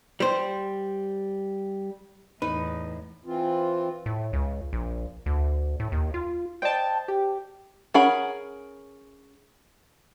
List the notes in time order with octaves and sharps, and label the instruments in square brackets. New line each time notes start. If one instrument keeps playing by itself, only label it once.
[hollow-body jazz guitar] G3 C5
[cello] E2 A2 [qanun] D#4 [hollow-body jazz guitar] B4
[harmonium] E3 C4 F4
[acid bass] A2
C#2
A#1
D2
A2
D#2
F4
[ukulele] C5 D5 D#5 [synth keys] G5 A5
[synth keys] G4
[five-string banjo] C#4 G#4 A#4 F#5 B5